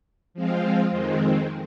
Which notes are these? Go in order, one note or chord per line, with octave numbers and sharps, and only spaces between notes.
F3 G#3 C4 F4
F2 D#3 G#3 C4